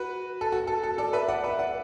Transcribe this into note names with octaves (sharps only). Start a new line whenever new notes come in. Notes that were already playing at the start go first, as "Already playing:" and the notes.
Already playing: F#4 B4
A4
F#4
A4
A4
A4 D5
B4 E5
D5 F#5
B4 E5
D5 F#5